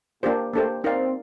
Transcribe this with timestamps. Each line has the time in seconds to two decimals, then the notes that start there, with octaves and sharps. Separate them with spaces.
0.23 A#2 A#3 D4 G4 C5
0.54 A3 A#3 D4 G4 C5
0.84 C4 D#4 A#4 D5 F5